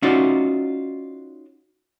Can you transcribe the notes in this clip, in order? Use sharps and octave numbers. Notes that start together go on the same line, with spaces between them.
C#4 D#4 F4 F#4 D5